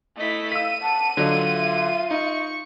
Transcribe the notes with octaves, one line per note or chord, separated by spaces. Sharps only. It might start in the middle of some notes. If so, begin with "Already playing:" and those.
A3 E4 D#5 B6
F5 E6 B6 D#7
F#5 A5
D3 F#3 F4 D#5
E5
D#4 C#6